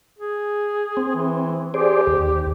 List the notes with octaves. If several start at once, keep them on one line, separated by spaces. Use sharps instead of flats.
G#4
C4
E3
G4 G#4 C5 D5
D#2